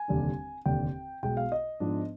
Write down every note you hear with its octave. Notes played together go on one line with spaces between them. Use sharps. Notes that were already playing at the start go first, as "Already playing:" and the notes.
Already playing: G#5
F1 D#2 D3 G3 D4
F1 D#2 D3 G5
B1 B2 G#3 G5
F5
D#5
G#2 F3 B3 D4